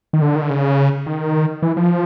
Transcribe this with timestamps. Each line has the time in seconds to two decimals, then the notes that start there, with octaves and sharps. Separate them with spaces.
0.13 D#3
0.22 D3
0.36 D#3
0.42 D3
0.50 C#3
1.06 D#3
1.62 E3
1.77 F3